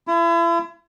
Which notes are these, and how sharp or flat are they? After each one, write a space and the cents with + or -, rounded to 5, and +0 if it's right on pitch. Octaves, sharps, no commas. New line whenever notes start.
E4 +40